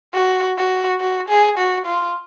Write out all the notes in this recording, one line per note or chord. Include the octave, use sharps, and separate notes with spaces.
F#4
F#4
F#4
G#4
F#4
F4